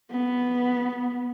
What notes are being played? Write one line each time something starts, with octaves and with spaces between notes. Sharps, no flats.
B3